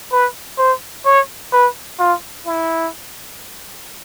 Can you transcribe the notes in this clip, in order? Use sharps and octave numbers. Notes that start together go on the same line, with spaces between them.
B4
C5
C#5
B4
F4
E4